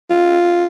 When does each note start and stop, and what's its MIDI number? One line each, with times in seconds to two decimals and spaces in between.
0.10 0.66 65